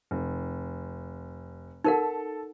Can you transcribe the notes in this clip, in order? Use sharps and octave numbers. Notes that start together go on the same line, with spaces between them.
F1
D#4 A4 A#4 F#5